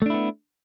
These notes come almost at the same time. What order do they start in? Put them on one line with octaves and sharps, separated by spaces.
A3 D4 E4 B3